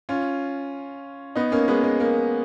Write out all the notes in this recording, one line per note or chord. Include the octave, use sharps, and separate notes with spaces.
C#4 F4
B3 D#4
A#3 C#4
G#3 B3
G#3
A#3